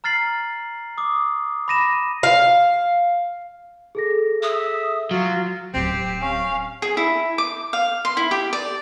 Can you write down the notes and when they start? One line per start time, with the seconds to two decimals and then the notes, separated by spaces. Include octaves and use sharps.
0.04 A#5 F6 A6 C7 F#7
0.98 D6 D#6
1.68 B5 D6 A#6 D#7 E7
2.23 F5
3.95 G#4 A4 A#6
4.43 E5 D#6
5.11 F#3 F4
5.74 D1 F#3 C4 G4
6.22 C#4 F5
6.82 G#4
6.97 E4
7.38 D6
7.73 F5
8.05 C6
8.17 E4
8.31 G4
8.53 D5